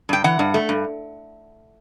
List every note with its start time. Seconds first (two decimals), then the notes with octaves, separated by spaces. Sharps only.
0.09 G2 G5
0.24 E3 F#5
0.39 G2
0.54 A3
0.69 G2